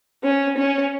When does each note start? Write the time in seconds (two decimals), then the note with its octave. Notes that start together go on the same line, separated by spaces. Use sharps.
0.24 C#4
0.57 C#4